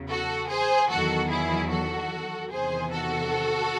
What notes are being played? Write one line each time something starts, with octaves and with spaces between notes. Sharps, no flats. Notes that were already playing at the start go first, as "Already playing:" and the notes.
Already playing: E2 C#3 F#3
F#4 A4
G#4 C5
E2 D#3 F#3 F#4 A4
E4 G#4
F#4 A4
E2 C3 D#3 G#4 C5
F#4 A4